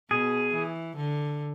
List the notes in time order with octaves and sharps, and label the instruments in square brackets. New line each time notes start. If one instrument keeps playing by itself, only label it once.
[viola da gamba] B2 [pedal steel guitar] G#4
[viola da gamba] E3
D3